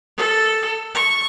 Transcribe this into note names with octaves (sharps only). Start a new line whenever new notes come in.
A4
C#6